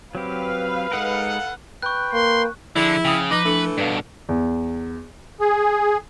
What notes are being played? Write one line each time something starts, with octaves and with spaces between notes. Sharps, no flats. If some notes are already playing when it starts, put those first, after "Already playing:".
F#3 C4 G4 B4 F5
G#3 D#4 A4 A#4 F#5
B4 G5 C#6 F#6
A#3 C6
D3 F3 E4 G#4
C#3 G5 D#6
F3 D#4 B4 D6 A#6 G7
E3 A3 D4 A4 C#7
G2 B2 B4 F5
E2
G#4